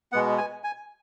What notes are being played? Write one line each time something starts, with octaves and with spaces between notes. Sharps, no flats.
B2 G#3 B3 F#5
G#5
G#5